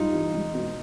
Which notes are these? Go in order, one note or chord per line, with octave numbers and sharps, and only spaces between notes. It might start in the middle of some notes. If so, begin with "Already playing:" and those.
Already playing: G2 D#4 F4
E3
C#2
B2